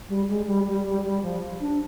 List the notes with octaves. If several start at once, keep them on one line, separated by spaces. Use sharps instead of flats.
G3
G#3
G3
G3
G3
G3
F3
D4